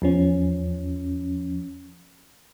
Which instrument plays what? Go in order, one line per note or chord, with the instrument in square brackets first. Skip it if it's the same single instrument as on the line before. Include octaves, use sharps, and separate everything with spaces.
[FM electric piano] E2 F3 C#4